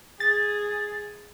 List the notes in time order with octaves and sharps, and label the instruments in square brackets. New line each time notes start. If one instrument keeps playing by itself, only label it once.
[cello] G#4 [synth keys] A6